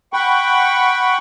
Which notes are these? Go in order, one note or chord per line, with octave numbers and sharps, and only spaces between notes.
F#5 G5 B5 C#6